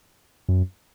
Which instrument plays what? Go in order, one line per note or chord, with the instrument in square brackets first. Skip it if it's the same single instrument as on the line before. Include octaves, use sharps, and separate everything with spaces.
[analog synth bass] F#2